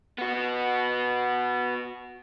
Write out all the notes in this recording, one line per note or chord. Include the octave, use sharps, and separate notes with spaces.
B3 F#4